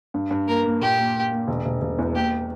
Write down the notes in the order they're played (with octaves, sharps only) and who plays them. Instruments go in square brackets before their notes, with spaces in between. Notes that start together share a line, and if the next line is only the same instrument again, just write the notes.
[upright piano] G2
G2
[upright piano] A#3 [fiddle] A#4
[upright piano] A#3
[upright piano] A#2 [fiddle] G4
[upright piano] A#3
A#3
A#3
E1
E1
E1
E2
[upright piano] A#3 [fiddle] G4